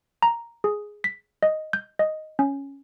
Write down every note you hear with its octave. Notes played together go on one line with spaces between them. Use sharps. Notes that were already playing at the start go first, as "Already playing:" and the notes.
A#5
G#4
B6
D#5
G6
D#5
C#4